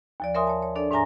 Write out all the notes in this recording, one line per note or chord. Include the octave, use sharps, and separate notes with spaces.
D#2 F3 D5
A#4 C#5 E5 G#5 C6 D#6
C#5 A5
C#5
D4 A4 D5
G#2 D4 E5 G#5 A#5 A#6